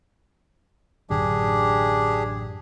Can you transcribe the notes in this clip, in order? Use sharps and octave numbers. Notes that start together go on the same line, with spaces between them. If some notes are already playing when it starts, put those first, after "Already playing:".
A1 F#2 D3 D4 G4 G#4